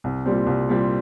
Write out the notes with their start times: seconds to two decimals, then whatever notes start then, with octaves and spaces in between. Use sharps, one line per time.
0.04 C2
0.26 A#2 G3 C4
0.47 C2
0.69 A#2 G3 C4